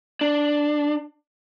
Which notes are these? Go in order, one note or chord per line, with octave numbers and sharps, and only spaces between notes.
D4